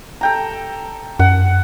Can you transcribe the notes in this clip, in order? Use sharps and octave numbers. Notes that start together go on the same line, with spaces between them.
A4 G5 A#5
F#2 F#5